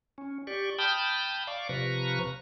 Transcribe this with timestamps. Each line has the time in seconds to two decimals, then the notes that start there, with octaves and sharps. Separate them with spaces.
0.18 C#4
0.47 G4 D5 C#6
0.79 G5 A5 B5 D#6 F6 G6
1.47 D5 F5 C#6 D6
1.69 C3 F3 B4 A#5 C#6